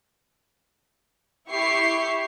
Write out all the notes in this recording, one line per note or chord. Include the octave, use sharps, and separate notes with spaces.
E4 G4 C#6 C7